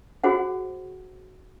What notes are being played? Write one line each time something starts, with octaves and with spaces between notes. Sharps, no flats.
F#4 G#4 C5 F#5